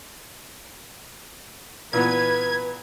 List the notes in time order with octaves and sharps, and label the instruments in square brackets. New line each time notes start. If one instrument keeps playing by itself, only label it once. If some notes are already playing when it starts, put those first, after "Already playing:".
[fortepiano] A#2 E3 B3 [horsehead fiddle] B4 [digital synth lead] G#6